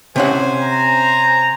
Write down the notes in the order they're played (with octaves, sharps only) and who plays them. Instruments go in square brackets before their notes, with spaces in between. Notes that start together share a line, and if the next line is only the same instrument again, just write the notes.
[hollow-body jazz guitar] C3 C#4 F#5 [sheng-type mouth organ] C5 G#5
[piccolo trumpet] A#5